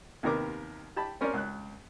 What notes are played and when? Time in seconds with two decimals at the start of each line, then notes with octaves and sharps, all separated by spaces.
0.23 D#2 C3 D#3 B3 A#4 D6
0.96 G4 A5 B5
1.21 C4 C#4 A#4 C5 D5
1.33 C#2 F#6